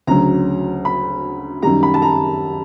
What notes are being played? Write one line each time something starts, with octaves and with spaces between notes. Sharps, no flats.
D2 C#3 F#3 A#5
B5
F#2 D#3 G3 A#5
B5
A5
A#5